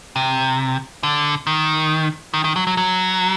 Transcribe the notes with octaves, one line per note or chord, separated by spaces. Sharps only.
C3
D3
D#3
D#3
D#3
F#3
F#3
F#3